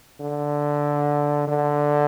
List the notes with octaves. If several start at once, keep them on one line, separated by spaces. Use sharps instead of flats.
D3
D3